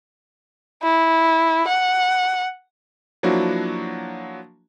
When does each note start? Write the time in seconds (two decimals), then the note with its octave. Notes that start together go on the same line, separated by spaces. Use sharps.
0.82 E4
1.68 F#5
3.23 F3 F#3 A#3 D4 E4 F#4